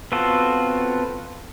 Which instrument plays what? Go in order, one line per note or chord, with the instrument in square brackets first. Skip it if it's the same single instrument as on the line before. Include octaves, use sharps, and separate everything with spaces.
[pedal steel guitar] B3 C4 F4 F#4 A4